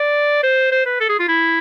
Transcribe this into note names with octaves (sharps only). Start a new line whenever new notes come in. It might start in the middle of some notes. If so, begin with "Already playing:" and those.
Already playing: D5
C5
C5
B4
A4
G#4
F4
E4